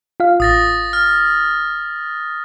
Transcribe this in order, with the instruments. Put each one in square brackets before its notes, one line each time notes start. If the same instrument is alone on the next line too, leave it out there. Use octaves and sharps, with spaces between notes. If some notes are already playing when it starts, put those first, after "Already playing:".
[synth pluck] F4 F5
[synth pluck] A1 [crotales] D#6 A6 A#6
[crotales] F6